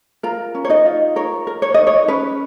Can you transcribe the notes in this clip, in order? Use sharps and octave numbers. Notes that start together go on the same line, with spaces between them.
F4 A#4 A#5
C#4
C#5
D#4 D#5
F4
A#4 C#5
A#4
C#5
D#4 D#5
C#5
C#4 B4